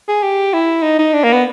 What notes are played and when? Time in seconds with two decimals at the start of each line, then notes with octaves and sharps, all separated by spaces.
0.09 G#4
0.23 G4
0.54 E4
0.83 D#4
0.99 D#4
1.13 D4
1.24 A#3
1.33 B3